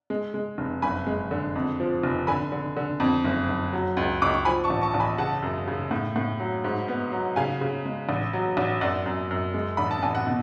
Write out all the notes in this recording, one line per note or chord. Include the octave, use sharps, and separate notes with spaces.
G#3
G#3
F1
F#1 G#5 B5
G#3
D3
F2
F3
F1
D3 G#5 B5
D3
D3
F2
F#1
F#1
F#3
C#2
C#2 D6
C#6
F3 G#5 B5
A5 C#6
A1
A5 C#6
A1
G#5 B5
C#3 F#5 A5
F#2
C#3
A2
A2
F#3
G#2
B3
F#3
C#3 F5 G#5
C#3
G#3
A1
F#3
A1
F#2 D5 F#5
F#2
F#2
G#3
A1 B5
A5
A1 G#5
F#5
B2